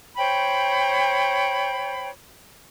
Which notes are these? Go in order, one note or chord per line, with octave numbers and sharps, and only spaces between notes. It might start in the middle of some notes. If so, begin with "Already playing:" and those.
C5 C#5 G5 B5